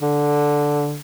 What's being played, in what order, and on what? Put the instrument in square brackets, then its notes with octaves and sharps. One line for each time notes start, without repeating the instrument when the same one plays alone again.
[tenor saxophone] D3